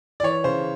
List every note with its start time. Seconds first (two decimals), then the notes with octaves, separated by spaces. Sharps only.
0.20 D5
0.23 E3 C#5
0.44 C#3 C5